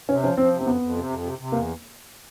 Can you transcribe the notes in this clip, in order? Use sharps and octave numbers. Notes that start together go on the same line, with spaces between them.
C3 C#4
F3 C#4
F3 C4
C3
C4
F2 B3
F2
C3
F2
C3
C3
E2 A#3